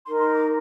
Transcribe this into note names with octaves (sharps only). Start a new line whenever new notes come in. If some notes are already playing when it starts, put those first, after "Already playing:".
D#4 A#4 C6
C6
D6